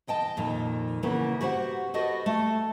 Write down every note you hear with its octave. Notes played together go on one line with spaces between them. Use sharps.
E2 D#5 G5 A5
F2 A#2 D#3
C#3 E3 A#3 B3 C#4
F#4 G4 C5 F#5
F#4 G4 A4 B4 D#5
A3